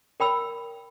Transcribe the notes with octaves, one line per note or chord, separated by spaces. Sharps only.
A#4 G5 B5 E6